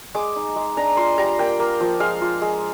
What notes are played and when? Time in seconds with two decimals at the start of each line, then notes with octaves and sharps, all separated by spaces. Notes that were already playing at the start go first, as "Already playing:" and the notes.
0.15 G#3 D6
0.36 D#4
0.56 G#3
0.77 D4 A#5
0.97 F4 C6
1.18 G3 A#5
1.38 A#3 G5
1.60 A#3
1.80 F3
2.00 G#3 F5
2.21 F4
2.42 G#3